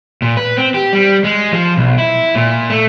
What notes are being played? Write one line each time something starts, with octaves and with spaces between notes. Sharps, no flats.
A#2
B4
C4
G4
G3
G#3
F3
B1
E4
A#2
A3